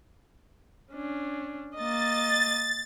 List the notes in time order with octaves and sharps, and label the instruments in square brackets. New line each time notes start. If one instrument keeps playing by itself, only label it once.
[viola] C#4 D4
[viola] A#3 D#5 [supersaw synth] A6